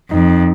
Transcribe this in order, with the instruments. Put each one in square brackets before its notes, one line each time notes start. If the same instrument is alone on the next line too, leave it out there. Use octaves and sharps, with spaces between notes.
[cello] F2 [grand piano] D#4